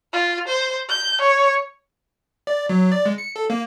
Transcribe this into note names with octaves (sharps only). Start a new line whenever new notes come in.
F4
C5
G6
C#5
D5
F#3
D5
G#3
C#7
A4
A#3